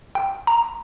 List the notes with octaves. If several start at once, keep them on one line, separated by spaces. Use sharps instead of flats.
G5
A#5